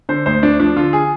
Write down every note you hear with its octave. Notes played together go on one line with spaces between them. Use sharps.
D3 C5
D2 C5
D2 D4
F3 D4
D3 F4
G#4